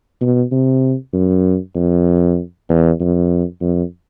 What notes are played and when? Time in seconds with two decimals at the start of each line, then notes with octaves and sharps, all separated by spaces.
0.21 B2
0.52 C3
1.13 F#2
1.75 F2
2.69 E2
3.00 F2
3.61 F2